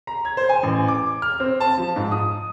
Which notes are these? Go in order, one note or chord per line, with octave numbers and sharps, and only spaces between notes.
A#5
G#6
C5
G#5
A1
D6
F6
C4
A5
F3
G#2
D#6